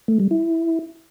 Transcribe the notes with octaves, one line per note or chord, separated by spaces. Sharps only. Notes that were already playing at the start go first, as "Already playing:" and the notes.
A3
G3
E4